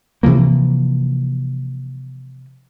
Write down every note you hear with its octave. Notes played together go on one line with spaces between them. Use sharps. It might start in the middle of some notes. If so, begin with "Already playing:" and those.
C3 E3 F3 A#3